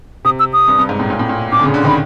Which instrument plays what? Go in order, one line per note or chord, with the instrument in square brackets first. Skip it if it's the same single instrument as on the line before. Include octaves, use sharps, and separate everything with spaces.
[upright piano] C3 [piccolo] D#6
[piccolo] E6
D#6
[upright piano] G2
G2
G#2
A2
A#2
A2
A#2
[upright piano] A#2 [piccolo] D6
[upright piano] D3
C#3
D3
[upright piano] D#3 [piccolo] B5